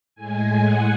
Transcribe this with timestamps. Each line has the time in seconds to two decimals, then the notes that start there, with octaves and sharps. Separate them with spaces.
0.15 A2 G#3 G#5
0.63 F#5